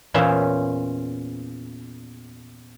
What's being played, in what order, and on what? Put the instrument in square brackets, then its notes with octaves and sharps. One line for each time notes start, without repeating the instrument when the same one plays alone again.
[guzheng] E2 A#2 C#4 C5 E5